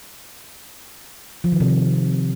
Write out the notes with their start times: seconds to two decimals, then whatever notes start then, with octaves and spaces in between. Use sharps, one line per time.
1.44 F3
1.52 D#3
1.60 C3
1.68 D#3